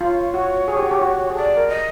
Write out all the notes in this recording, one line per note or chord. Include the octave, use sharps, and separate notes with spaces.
F4 C#5
F#4
G#4
G4
F#4
G4
F#4
G#4
A4 D5
A#4
D#5